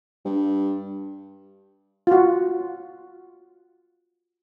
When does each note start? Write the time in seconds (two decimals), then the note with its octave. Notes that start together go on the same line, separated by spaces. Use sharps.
0.25 G2
2.07 F4 F#4